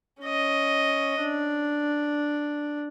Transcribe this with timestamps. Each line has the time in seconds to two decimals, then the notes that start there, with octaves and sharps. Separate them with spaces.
0.22 C#4 D#5
1.21 D4